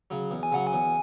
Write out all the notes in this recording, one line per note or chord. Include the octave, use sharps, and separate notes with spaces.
C#3 F#3
E2
G#5
C#3 F#3 F#5
G#5
E2